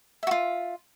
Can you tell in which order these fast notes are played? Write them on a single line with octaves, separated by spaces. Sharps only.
E5 F#4 F4